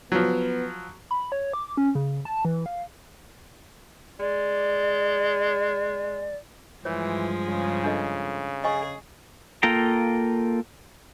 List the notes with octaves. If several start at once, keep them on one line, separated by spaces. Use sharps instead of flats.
F3 F#3 B3
B5
C#5
D6
C#4
C#3
A5
E3
F5
G#3 D5
G2 E3 F3 G#3 C#5
C#3
D4 A4 D#5
G#4 D#5 G#5 C#6
A#3 F4 A4 G5 A#5